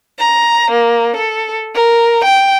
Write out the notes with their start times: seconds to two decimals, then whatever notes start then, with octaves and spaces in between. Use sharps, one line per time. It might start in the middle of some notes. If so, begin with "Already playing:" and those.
0.19 A#5
0.71 A#3
1.16 A4
1.75 A#4
2.24 G5